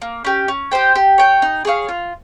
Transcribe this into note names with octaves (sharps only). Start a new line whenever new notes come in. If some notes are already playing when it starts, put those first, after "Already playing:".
A#3
C#4 G4
C#4
G4 C5 G5
G4
C#5 G5
D#4
G#4 C#5 F5
F4